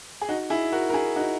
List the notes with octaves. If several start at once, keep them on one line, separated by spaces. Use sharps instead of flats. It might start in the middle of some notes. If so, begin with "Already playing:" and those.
G#4
D#4 F#4
E4 G#4
F#4 A#4
A#4
E4 G#4
D#4 F#4